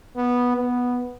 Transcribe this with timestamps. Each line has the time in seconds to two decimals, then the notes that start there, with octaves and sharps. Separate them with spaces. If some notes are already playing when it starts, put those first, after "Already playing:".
0.16 B3
0.57 B3